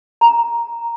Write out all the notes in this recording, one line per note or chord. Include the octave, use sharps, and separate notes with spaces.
A#5